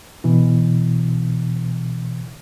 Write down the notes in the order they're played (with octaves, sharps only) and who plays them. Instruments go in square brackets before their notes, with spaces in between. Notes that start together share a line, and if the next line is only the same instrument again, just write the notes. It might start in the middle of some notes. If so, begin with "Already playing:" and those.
[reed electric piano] B2 E3